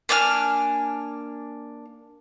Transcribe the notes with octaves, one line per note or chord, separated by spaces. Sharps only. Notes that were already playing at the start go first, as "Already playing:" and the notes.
A#3 D4 G#5 F6